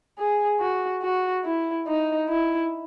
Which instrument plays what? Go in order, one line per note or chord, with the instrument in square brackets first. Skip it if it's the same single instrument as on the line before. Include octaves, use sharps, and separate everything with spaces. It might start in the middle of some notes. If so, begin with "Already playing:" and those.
[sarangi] G#4
F#4
F#4
E4
D#4
E4